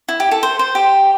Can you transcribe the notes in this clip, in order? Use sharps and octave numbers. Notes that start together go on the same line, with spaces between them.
E4
G4
A4
C5
C5
G4